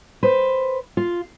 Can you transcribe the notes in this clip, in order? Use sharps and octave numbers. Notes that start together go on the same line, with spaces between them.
B4 C5
F4